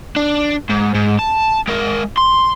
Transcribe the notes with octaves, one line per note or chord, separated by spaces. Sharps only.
D4
G#2
G#2
A5
G#3 A#4
C6